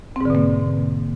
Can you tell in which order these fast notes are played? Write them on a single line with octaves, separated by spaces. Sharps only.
C4 G#2 D3 B2 A#3